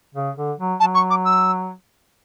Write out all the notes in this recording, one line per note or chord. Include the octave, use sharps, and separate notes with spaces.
C#3
D3
F#3
F#3 A5
C#6
D6
E6